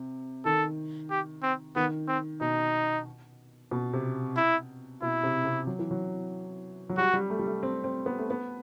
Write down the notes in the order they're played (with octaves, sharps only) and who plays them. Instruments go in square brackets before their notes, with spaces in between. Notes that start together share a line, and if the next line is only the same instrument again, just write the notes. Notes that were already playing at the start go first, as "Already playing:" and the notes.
Already playing: [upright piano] C3
[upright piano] D#3 [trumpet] A4
[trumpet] G4
C4
[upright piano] D#3 [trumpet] B3
[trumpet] C4
[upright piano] B2 [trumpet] D#4
[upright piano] B2
C3
[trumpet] E4
[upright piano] B2 [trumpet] E4
[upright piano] C3
C3
F#3
E3
F#3
F#3
[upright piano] G3 [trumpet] F#4
[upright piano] G3
A3
G3
A3
C4
C4
B3
A3
B3